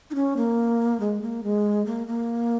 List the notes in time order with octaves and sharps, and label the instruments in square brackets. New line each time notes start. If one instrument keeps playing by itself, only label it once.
[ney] D#4
C#4
A#3
G#3
A#3
G#3
A#3
A#3